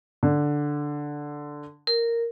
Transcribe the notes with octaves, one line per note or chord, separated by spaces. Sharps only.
D3
A#4